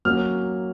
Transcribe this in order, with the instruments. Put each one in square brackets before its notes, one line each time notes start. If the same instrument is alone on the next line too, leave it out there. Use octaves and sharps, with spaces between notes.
[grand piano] F#3 A#3 C#4 F6